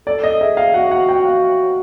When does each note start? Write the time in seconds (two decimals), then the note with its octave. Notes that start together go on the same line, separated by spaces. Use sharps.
0.07 A4 D5
0.24 D#5
0.41 G#4 E5
0.57 F5
0.74 F#4 F#5
0.91 F#5
1.09 G5
1.25 F5